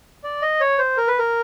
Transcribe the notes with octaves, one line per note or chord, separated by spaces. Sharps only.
D5
D#5
C#5
C5
A#4
B4
A#4